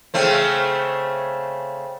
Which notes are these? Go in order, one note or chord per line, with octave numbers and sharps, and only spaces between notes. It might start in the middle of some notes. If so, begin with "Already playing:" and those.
C#3 A3 C4